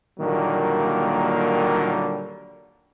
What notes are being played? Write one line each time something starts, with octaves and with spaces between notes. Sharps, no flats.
A#2 D3 D#3 F#3 G3 A#3